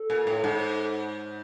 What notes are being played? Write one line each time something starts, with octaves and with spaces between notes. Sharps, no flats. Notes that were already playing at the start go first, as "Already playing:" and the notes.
Already playing: A4
A#2
A2
G#2